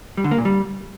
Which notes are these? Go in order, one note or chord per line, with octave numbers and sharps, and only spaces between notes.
G3
D3
A#3
A#2
G3